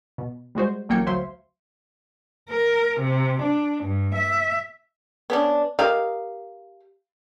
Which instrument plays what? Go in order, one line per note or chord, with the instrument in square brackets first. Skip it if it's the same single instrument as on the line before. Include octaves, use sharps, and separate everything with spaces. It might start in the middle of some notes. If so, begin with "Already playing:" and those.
[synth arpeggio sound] B2
G3 G#3 F#4 C5
A1 F#3 A#3 G5 G#6 C#7
D2 F#3 C5 E5 F5 C6
[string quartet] A#4
C3
D4
G2
E5
[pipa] B3 C#4 D4
G4 A#4 D#5 F5